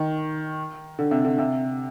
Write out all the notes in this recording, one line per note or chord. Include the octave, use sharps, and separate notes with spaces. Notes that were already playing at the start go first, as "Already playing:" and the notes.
Already playing: D#3
D3
C3
D3
C3